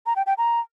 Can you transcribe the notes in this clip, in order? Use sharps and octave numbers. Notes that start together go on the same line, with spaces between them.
A#5
G5
G5
A#5